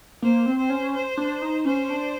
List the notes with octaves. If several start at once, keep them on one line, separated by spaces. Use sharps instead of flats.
A#3 C5
C4
C5
C#4
C5
D4
D#4
C#4 C5
D4